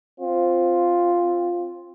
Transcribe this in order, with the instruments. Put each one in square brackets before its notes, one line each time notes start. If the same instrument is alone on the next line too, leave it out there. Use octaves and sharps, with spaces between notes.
[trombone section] C4 F4